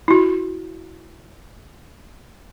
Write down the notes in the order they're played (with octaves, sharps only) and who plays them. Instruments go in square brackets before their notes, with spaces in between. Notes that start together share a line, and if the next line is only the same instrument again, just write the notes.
[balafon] E4 F#4